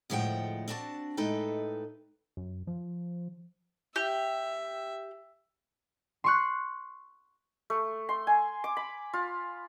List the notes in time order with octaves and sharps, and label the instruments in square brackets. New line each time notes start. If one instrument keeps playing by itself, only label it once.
[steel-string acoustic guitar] D2 A2 F3 G#3 F#5 G5
C4 D4 F#4 G#5 A5
A2 G#3 D#4 A4 B4 G5
[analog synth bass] F#2
F3
[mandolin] G4 [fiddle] E5
[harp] C6 C#6 F#6
[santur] A3
C6
G#5
D6
B5
F4